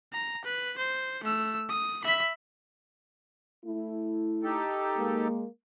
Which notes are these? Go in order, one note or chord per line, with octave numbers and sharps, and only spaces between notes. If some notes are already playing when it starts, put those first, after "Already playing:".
A#5
B4
C5
A3 E6
D#6
E5 B5
A3 E4
D#4 G4 A4
G#3 A#3